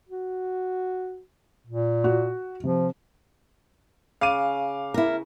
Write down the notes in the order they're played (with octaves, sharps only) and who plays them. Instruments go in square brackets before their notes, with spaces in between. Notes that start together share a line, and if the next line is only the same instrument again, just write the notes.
[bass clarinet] F#4
A#2
[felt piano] F#4
[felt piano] C3 [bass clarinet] F3
[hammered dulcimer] C#3 [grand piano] F5 D6 D#7
[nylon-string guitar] E4 A#4